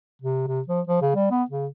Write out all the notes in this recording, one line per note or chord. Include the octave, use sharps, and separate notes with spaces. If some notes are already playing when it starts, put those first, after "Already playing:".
C3
C3
F3
F3
C#3
G3
B3
C#3